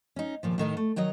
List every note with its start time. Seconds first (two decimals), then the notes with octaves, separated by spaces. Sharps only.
0.16 C#4 D#4
0.43 D#2 A#2 F3
0.58 A2 D#3 D#4 A#4
0.77 A3
0.96 D#3 F#3 C#5 D#5